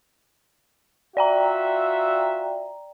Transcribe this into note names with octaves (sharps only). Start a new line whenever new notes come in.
F4 F#4 D5 E5 G5 A#5